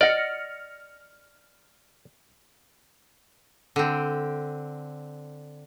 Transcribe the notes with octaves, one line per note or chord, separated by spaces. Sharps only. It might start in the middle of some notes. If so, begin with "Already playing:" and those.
D5 D#5 F#5 F6 A#6 C#7
D3 C4